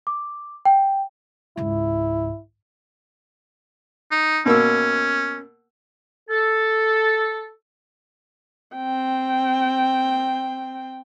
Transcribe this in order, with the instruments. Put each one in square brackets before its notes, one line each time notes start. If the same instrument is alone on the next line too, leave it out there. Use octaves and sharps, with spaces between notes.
[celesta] D6
G5
[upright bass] C#2 G#2 [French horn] E4
[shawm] D#4
[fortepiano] B2 A#3 E6 [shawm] C#4
[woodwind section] A4
[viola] C4 G5